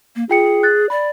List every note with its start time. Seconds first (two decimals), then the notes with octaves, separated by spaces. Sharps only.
0.16 A#3
0.29 F4 G#4 G5 C#7
0.63 F#6 A6
0.90 D5 B5